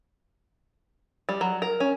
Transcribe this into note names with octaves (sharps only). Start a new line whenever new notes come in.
G3
F#3
A#4
C#4